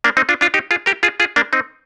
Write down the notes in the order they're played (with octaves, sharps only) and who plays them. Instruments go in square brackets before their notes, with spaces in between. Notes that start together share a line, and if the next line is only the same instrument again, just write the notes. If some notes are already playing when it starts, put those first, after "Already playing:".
[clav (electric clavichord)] A#3 D4
C4 D#4
D4 F4
D4 F4
D#4 G4
F4 G#4
G4 A#4
F4 G#4
F4 G#4
A#3 D4
C4 D#4